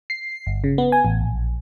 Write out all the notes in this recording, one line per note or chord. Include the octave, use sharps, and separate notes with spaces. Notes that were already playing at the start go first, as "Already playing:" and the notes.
C7
G1
C#3
B3
G#5
A1
A#1